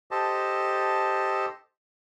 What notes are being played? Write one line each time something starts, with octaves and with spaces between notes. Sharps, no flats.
G4 A4 C5 D#5 A5